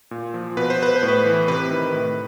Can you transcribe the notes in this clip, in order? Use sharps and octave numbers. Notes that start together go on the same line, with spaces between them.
A#2
F3
B2 B4
C5
B4
C5
A2
B4
E3
C3 B4
D#3
A2